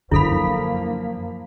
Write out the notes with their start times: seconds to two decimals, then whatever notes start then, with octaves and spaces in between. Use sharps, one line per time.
0.11 F#2 D3 F3 A#3 E4 A4 B5 B6